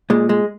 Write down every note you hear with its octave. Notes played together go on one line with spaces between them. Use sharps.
A#2 G#3
G#3